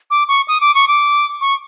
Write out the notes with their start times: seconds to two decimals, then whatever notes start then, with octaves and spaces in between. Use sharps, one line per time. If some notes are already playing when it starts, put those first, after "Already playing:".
0.11 D6
0.28 C#6
0.48 D#6
0.61 D6
0.75 C#6
0.88 D6
1.41 C#6